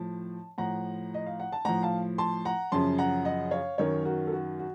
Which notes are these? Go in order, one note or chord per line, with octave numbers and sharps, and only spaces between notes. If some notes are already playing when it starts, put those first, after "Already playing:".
Already playing: A2 F3 A5
A2 F3 F#5 A#5
D#5
F5
F#5
A5
A2 F3 F#5 A#5
F5 A5
A5 C6
F#5 A#5
F#2 C#3 F3 A5 C6
F#5 A#5
D#5 F#5
C#5 F5
F#2 D#3 F#3 A#4 C#5
F#4 A#4
A4
F#4
F#4